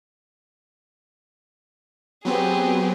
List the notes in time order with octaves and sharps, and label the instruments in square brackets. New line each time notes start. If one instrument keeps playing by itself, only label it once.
[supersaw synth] F#3 B3 C4 [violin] G4 G#4